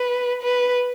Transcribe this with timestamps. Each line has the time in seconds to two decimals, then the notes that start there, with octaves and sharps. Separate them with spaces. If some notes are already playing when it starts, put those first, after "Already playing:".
Already playing: B4
0.43 B4